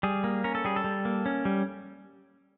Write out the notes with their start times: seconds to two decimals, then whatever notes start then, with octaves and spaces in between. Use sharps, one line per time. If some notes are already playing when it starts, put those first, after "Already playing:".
0.03 G3 G#4
0.24 A#3
0.44 C#4 A#4
0.55 A4
0.65 G3 G#4
0.76 A4
0.84 G3
1.05 A#3
1.26 C#4
1.45 G3